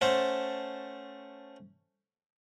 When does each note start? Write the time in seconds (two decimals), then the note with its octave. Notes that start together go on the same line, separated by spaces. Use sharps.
0.01 A3 C#4 C5 F#5 A5